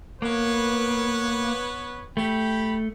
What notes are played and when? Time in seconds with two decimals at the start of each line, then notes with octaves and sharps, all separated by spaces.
0.22 A#3 B3 B4 C#5
2.17 A3 G4 G5 B5